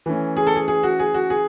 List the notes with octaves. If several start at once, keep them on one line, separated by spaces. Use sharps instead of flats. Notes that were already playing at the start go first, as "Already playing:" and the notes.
E3 A3 C#4
G#4
A4
G#4
G#4
F#4
G#4
F#4
G#4